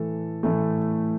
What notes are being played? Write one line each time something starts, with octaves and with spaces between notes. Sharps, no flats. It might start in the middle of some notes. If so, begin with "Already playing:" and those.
Already playing: A2 E3 A3 A4
A2 E3 A3